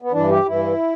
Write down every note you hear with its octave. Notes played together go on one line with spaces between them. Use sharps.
B3
G2 E3 D4
G4
G2 E3 E4